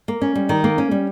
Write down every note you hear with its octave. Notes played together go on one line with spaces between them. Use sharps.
A#3
C#4
G3
D#3
A#3
C#4
G3